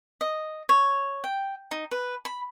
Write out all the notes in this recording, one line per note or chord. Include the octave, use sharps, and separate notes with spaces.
D#5
C#5
G5
D#4
B4
B5